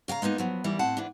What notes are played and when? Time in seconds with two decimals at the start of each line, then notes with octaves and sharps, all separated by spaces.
0.08 C#3 F5 G5 A#5
0.22 G#3 A#3 B3 D#4
0.38 F3 F#3 B3
0.64 D#2 E3 G3
0.79 A2 C4 F#5 A5
0.97 G#2 E3 D4